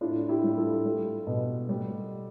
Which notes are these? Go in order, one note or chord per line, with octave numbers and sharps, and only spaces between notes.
A2 D4 F4
E4 G4
G3
F4 A4
G3
B2
G3